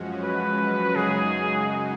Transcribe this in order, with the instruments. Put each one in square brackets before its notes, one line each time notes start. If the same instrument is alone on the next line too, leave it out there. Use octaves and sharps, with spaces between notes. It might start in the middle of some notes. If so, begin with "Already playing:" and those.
Already playing: [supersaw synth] F#2 F3 G#3 C#4 F#4
[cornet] B4
[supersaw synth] F#2 C#3 G#3 D#4 F#4 [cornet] G#4